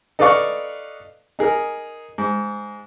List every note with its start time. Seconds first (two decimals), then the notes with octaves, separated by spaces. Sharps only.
0.19 D#4 A4 B4 D5 F5 C#6
1.39 D#4 G#4 A#4
2.18 G#2